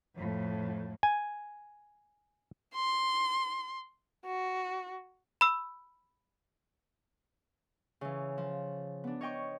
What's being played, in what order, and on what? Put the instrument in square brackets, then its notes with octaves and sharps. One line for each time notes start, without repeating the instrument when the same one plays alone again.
[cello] F2 A2
[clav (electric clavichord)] G#5
[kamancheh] C6
F#4
[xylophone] B5 E6
[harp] C#3 E3
F3
B3 D4
C#5 D#5 G5 C#6